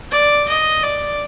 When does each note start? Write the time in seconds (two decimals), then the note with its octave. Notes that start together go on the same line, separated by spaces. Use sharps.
0.12 D5
0.48 D#5
0.83 D5